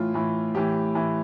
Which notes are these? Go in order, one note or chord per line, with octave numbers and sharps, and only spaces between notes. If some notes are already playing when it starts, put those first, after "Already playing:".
Already playing: A2 E3 F4
A2 E3
A2 E3 G4
A2 E3